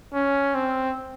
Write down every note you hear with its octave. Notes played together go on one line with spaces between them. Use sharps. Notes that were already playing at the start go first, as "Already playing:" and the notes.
C#4
C4